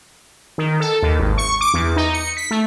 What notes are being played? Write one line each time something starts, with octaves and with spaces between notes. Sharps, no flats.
D#3
A4
D#2
G#1
C#6
D6
E2
D#4
C#7
B6
A3